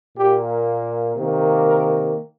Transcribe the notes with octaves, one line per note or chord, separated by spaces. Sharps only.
A#2 A#3 G4
C3 D#3 A#3
A#4